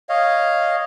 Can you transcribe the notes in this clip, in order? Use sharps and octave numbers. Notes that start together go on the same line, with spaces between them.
C#5 D#5 F5